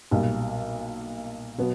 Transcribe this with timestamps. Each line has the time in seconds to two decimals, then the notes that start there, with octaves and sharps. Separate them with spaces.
0.11 B1 A#2 G3
1.58 B2 F#3 B3